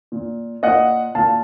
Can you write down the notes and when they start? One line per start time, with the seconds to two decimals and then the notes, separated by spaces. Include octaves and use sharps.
0.12 A#2
0.63 A#2 D#5 F#5
1.15 A#2 F5 A5